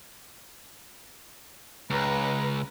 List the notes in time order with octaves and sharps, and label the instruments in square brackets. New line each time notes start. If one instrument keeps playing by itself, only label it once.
[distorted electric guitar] C#2 [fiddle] B4 A#5